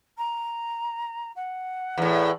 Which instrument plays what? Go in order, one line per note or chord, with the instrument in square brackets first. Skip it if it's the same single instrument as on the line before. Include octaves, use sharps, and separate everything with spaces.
[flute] A#5
F#5
[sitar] E2 A2